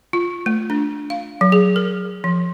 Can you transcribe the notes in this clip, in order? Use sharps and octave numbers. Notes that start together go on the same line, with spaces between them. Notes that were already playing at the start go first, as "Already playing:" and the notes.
F4
A3
D4
F5
F#3
G#4
A#4
F3